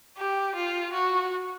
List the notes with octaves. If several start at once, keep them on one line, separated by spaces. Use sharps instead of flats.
G4
F4
F#4